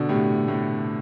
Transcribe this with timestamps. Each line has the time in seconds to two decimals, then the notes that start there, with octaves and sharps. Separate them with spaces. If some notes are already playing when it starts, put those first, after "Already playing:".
Already playing: B2 D3
0.09 A2 C3
0.48 A2